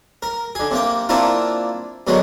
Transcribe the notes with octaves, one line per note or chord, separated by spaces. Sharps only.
A#4
D3 G#4
C3 A#3 G5
A#3 C4 D4 E4 F4 A#4
B2 D3 F#3 G#3 A#3